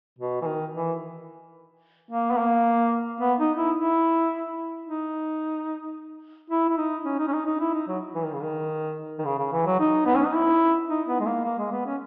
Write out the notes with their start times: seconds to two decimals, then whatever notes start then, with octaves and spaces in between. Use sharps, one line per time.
0.19 B2
0.42 E3
0.46 D#3
0.74 E3
2.11 A#3
2.31 B3
2.38 A#3
3.21 B3
3.39 D#4
3.58 E4
3.76 E4
4.86 D#4
6.50 E4
6.69 E4
6.78 D#4
7.05 C#4
7.19 D#4
7.28 C#4
7.33 D#4
7.46 D#4
7.60 E4
7.74 D#4
7.88 F#3
8.15 E3
8.24 D#3
8.33 C#3
8.42 D#3
9.19 D#3
9.25 C#3
9.39 C#3
9.52 E3
9.66 F#3
9.80 D#4
10.06 B3
10.16 C#4
10.25 D#4
10.35 E4
10.89 D#4
11.08 B3
11.20 G#3
11.26 A#3
11.44 A#3
11.58 G#3
11.72 B3
11.86 C#4